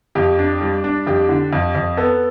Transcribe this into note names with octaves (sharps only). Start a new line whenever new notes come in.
F2 G4
D4
G3
D4
F2 G4
D3
F2
F2
B3 A4